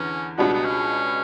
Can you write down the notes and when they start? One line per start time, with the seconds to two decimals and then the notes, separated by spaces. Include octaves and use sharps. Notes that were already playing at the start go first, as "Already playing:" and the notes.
Already playing: E2 D3 C#4
0.38 C#2 B2 G3 B3 D4 F#4
0.53 B3
0.65 C#4